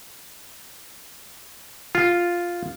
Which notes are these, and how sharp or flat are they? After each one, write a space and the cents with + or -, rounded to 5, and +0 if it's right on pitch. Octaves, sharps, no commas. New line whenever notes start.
F4 +0